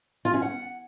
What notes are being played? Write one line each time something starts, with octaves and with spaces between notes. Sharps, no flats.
F4
C#4
F#5